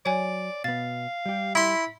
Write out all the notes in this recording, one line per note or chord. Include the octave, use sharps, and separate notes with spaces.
F#3 C#5 D5 G#5
B2 B3 F5 A6
G3 G4
E4 B5 C6